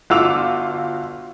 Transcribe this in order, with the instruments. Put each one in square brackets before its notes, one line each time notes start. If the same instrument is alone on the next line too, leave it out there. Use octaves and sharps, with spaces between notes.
[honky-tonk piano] G1 F4 F#4 D6 E6 F7